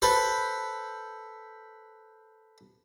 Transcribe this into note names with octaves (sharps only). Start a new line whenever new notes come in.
A4 B4 C5